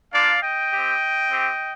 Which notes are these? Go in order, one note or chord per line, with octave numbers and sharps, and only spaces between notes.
A#3 D4 F4 D5 F5
D#5 G5
C4 G4
C4 G4